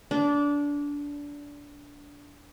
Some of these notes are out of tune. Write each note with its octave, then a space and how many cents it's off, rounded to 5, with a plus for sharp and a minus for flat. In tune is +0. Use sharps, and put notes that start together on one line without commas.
D4 -20